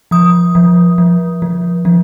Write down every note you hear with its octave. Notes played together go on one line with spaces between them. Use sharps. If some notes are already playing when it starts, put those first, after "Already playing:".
F3 D#6
F3
F3
F3
F3